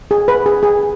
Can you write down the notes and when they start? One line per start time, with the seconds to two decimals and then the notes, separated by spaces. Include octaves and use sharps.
0.11 G#4
0.28 B4
0.46 G#4
0.63 G#4